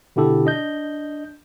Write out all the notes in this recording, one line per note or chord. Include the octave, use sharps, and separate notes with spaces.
B2 D3 E4 G4 A4
D4 D#5 G6